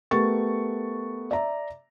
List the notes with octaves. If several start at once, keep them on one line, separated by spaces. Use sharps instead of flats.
A3 B3 G4 A#4 C#6 A6
D5 E5 A#5